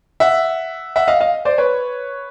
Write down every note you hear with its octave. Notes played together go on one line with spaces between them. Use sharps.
E5 F#5
E5 F#5
D#5 F5
D#5 F5
C5 D5
B4 C#5